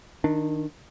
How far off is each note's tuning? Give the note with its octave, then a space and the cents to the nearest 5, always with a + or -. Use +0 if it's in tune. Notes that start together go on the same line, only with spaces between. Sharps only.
D#3 +0 D4 +20